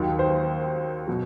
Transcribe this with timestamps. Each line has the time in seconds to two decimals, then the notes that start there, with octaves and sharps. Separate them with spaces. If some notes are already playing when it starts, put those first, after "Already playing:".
Already playing: D#2 D#3 F#3
0.19 C5
1.07 B2 F#3